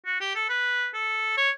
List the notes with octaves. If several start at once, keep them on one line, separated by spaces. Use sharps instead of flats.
F#4
G4
A4
B4
A4
C#5